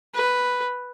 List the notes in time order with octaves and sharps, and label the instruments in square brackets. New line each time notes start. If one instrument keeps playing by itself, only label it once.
[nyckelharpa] B4